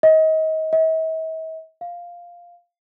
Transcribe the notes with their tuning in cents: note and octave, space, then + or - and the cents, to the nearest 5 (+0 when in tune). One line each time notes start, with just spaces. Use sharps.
D#5 +30
E5 -45
F5 +0